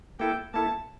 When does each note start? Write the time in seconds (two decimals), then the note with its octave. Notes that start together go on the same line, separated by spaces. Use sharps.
0.19 A#3 E4 A4 G5
0.54 A#3 E4 A4 A5